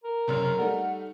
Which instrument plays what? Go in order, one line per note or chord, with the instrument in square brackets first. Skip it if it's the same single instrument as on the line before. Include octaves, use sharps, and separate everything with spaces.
[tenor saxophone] A#4
[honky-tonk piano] F#1 F#2 F6 [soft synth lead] C3
[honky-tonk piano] G3 A3 D#4 [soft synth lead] F#5